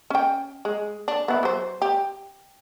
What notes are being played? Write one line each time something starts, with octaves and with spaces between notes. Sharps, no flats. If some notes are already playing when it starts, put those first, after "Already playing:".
C#4 G5
G#3
D4
B3 E4
F#3 C5
G4